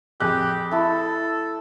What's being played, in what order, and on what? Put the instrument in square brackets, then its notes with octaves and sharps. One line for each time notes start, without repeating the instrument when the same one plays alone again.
[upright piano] F2 F#6 [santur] G#3 [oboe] G4
[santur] A3 E4 [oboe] A4